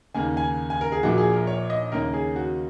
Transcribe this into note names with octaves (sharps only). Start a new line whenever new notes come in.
D#2 C#3 A#3 G#5
G#5
G#5
A#4
G#4
A#1 A#2 A#3 F#4
G#4
A#4
C#5
D#5
D#2 C#3 A#3 C#4 A#4
G#4
F#4